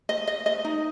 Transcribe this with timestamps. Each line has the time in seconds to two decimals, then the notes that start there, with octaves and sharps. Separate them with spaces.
0.09 D#5
0.27 D#5
0.46 D#5
0.65 D#4